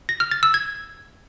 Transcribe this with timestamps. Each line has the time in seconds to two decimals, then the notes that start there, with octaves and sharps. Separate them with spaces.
0.09 A#6
0.20 F6
0.31 A6
0.43 E6
0.54 G#6